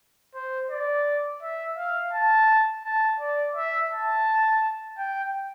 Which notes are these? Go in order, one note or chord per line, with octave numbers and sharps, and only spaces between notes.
C5
D5
E5
F5
A5
A5
D5
E5
A5
G5